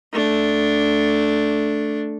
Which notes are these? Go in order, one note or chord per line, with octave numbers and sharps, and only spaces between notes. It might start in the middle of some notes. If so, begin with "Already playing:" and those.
A3 D4